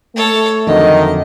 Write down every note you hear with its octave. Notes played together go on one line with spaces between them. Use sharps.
A3 A4 C#5
F2 D3 D#3 F#3 D#5